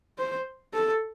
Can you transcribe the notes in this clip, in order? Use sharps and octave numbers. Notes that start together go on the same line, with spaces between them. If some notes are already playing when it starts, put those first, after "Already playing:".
C5
A4